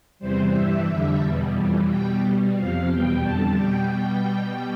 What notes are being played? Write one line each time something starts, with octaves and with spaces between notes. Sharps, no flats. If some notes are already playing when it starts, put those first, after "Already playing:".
E2 C3 E3 G3 C5
G2 E3 G3 E5
F2 D3 G3
E2 B2 G3
F2 E3 G3
B2 G3 G5
B2 G3
F2 C3 F3 F5
E2 B2 G3 G5
F2 D3 G3 A5
B2 G3 G5
B2 G3 G5
B2 G3